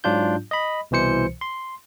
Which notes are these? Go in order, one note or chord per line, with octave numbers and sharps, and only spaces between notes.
G#2 F#3 D4 F4 G6
D#5 B5
C2 B2 E3 C5 C#7
C6